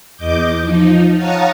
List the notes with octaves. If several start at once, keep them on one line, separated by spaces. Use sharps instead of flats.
E2 D#5 D6 G6
F3 D#4
C#5 F5 F#5 A5 A#5 D#6